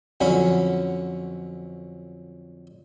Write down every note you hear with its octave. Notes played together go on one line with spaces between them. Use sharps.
F2 D3 F#3 C#4 B5